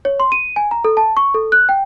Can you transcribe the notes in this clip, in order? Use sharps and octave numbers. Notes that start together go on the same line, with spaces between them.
C#5
C6
D#7
G#5
A#5
A4
A5
C#6
A4
F#6
G5